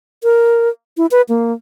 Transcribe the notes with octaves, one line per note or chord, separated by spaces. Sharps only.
A#4
E4
B4
A#3